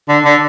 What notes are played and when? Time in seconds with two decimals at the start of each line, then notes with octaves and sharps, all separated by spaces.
0.09 D3
0.25 D3